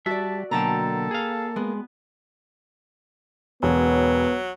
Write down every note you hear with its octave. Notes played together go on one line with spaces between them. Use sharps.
G3 F#4 D5 E5 A5
B2 D3 F#3 A#3 A4 G5 A5 A#5
G#4 F5
G#3 B3
E1 F#3 B3